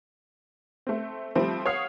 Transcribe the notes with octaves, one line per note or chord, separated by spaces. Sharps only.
A3 C4
F3 G3 A3 C4
C#5 F5 F#5 D#6 F6 C7